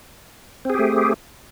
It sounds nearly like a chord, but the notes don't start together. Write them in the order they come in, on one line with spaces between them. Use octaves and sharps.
C4 G#4 G4 A3